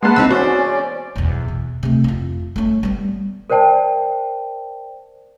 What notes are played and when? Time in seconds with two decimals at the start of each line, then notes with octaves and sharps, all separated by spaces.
0.03 G#3 A#3 B4 F#5 A5 C6
0.16 E3 C4 D#4 B5 E6
0.31 E2 C#4 F#4 C5 D5
1.16 B1 E2
1.48 B2
1.83 C3 A3
2.04 F2 F4
2.56 A3 C#4
2.83 G3 B3
3.50 A#4 C5 D5 G5 A5